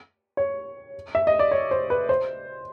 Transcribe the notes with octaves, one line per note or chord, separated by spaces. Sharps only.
C#5
E5
D#5
D5
C#5
C5
B4
C5